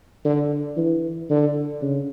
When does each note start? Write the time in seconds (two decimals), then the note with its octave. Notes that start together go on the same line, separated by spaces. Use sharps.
0.25 D3
0.77 E3
1.30 D3
1.82 C#3